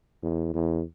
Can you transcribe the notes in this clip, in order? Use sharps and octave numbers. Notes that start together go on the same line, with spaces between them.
E2
E2